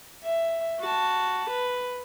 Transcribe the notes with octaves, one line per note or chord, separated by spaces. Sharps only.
E5
F#4 A5
B4